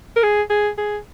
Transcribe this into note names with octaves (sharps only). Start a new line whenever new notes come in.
A#4
G#4
G#4
G#4